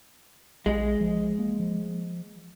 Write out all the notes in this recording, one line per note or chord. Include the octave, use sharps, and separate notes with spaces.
A#1 G#3
F3
A#3
F3